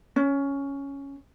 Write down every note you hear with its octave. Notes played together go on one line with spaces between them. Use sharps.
C#4